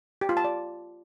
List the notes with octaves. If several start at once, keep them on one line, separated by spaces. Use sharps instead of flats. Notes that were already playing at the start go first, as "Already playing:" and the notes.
G4
F4
A5
D5